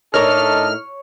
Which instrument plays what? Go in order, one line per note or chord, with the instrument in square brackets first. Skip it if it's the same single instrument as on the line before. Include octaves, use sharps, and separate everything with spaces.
[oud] A2 D#4 A#4 [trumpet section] D4 A4 D#5 [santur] C#5 [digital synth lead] F6